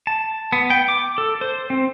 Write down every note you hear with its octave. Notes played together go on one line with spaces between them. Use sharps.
A5
B3
G5
D6
A4
C5
C4